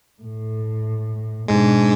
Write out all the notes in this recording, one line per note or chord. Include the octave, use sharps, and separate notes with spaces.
A2
G#2 B2 G#3 D4